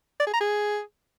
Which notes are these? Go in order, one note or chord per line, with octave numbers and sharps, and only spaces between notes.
D5
G#4
A#5
G#4